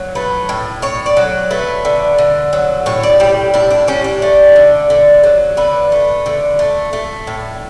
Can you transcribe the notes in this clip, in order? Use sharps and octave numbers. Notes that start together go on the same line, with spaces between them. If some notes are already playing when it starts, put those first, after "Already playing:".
Already playing: F#3
A3 B4
A2
A2 C#5
D5
F#3
A3 B4
D3
D3
F#3
A2 C#5
D5
G3 G4
A2 E4
D4
G3 C#4
D4
A3
D3
D3
F#3
D3 B4
A3
D3
A3
A3
A2